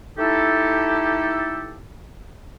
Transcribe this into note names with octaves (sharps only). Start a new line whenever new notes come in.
A3 D#4 E4 G4 A4